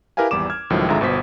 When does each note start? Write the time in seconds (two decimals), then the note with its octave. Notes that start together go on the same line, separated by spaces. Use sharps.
0.17 E4 G4 A#4 B4 F5 G#5
0.31 G#1 E2 G3 D6 E7
0.50 F6 G#6
0.70 C#2 A2 D#3 F3 F#3
0.88 G#1 D3 G#3 F4 E5 A#5
1.01 G1 B2 C5 B6